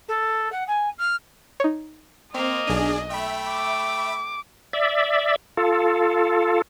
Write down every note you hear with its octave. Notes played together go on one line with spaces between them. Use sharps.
A4
F#5
G#5
F6
D#4 C#5
A#3 C4 D#5
B1 D4 G#4 D#7
A3 E5 G5 B5
D6
D5 E5
F4 A4